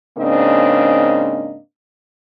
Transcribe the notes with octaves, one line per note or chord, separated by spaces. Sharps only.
G#2 C#3 A#3 C4 D4 D#5